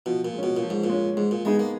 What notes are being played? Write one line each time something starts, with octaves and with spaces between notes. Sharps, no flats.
B2 F3
A#2
G#3 C#4
B2
A#2
F3
G#2
A#2
G#3 C#4
G#2 G#3
A#2
G#3 B3 D#4 G#4
A#3